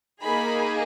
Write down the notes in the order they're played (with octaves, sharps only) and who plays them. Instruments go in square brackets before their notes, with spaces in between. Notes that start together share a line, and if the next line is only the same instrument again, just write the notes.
[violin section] A#3 D#4 G#4 B5